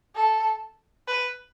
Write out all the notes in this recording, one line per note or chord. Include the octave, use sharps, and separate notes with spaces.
A4
B4